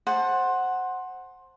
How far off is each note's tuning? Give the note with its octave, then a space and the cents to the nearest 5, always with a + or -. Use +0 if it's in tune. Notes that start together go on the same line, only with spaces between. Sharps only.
C5 +15 F#5 +0 A5 +0